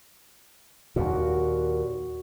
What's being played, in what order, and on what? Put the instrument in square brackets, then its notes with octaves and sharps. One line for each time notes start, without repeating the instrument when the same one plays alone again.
[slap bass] D#2 A#2 [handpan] F#4